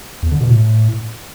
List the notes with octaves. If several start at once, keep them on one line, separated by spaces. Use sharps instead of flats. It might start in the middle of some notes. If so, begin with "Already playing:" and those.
E2
D3
B2
A2